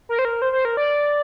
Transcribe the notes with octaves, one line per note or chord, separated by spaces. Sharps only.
A#4
C5
A#4
C5
C5
A#4
D5